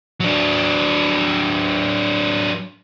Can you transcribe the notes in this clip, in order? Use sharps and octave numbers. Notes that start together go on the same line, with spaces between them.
F#3 D4